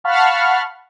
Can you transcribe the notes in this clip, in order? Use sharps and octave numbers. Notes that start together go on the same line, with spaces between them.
F5 F#5 A5 B5 C#6 F6